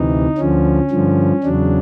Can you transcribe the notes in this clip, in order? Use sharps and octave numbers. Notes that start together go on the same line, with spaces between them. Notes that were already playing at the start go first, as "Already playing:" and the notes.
Already playing: D2 C3 E3 D#4
D2 D3 F3 C#4
G2 D3 F3
E2 C#3 F#3 D4